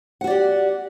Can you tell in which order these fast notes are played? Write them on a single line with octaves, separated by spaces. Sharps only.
F#5 F#4 D5 G4